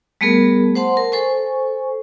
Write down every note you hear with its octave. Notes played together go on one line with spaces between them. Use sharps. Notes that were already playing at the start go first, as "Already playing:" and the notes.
G3 A3 B3 G#4 A#4
C5 F#5 A5 C6
A#4
A4 C5 G#5 C#6